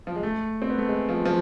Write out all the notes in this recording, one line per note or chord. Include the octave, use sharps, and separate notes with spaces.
F3
G#3
A3
C4
B3
A3
G#3
F3
F3